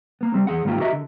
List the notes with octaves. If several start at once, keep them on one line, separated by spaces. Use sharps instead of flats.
A#3 B3
G3 C4
E2 G#4 F#5
G#2 D#3 A#3 F4 G4
F#4 G4 A#4 D#5 E5
D3